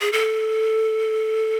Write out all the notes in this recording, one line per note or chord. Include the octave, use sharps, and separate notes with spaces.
G#4
A4